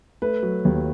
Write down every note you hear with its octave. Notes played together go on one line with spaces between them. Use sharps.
A3 B4
F#3
D#2